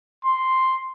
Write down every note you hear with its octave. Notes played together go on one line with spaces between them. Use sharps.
C6